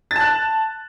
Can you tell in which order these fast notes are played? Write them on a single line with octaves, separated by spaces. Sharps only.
A6 A5 F#6